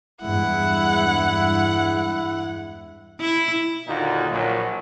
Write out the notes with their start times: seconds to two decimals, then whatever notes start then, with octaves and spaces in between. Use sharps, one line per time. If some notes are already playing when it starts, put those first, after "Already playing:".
0.22 E2 G2 G#3 E4 F#5
3.21 E4
3.88 D#2 A#2 D3 D#4 F4 F#4
4.31 A#1 A#2 F#3